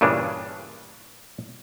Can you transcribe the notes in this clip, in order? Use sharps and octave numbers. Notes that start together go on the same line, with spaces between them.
G2 A#2 C#3 E3 D4